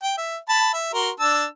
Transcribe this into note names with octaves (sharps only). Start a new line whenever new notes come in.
G5
E5
A5 B5
E5
F#4 A#4 C6
D4 A5 E6